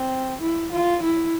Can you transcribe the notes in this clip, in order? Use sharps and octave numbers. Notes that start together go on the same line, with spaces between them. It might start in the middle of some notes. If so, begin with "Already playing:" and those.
Already playing: C4
E4
F4
E4